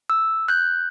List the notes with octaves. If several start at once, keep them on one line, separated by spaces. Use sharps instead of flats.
E6
F#6 G6